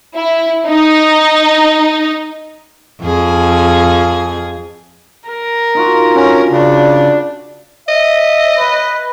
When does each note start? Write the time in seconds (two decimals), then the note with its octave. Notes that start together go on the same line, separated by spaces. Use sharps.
0.14 E4
0.68 D#4
3.01 F2 G#4
5.29 A#4
5.75 D#4 F4 F#4
6.15 D3 C#4
6.51 C#3 D4
7.89 D#5 E5
8.59 B4